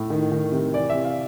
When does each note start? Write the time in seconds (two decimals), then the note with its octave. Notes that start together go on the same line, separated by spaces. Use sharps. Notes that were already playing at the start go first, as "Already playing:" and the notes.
Already playing: A2
0.10 D#3
0.32 D#3
0.52 C3
0.73 E3 D5
0.90 E5
0.95 C3
1.05 F5